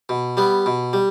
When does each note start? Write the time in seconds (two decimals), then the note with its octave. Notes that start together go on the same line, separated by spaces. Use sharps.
0.09 B2
0.37 G3 B3
0.66 B2
0.93 G3